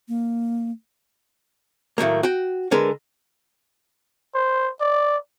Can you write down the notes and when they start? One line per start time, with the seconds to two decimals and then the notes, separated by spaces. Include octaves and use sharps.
0.08 A#3
1.98 A2 D#3 F#3 A#3
2.23 F#4 G5
2.71 D3 G#3 A#4 B4
4.35 C5
4.81 D5